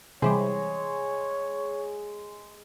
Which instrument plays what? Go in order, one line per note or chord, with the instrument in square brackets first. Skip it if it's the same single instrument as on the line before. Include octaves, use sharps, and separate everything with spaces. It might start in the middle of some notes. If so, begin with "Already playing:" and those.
[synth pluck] C3 E3 G3 [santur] G#3 [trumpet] C#5